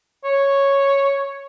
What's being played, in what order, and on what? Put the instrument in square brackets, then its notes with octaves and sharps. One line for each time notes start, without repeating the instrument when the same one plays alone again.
[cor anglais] C#5